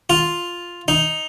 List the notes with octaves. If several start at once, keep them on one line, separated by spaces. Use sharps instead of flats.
F4
D#4